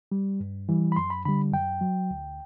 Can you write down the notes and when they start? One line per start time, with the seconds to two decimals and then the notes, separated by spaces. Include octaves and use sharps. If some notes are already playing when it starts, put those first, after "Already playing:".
0.12 G3
0.40 G2
0.69 E3 G3
0.92 B5
0.96 F#2 C6
1.10 B5
1.25 D3 G3 B5
1.53 F#2 G5
1.81 F#3
2.11 D2